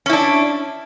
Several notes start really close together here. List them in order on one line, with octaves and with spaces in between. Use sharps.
C#4 E4 D4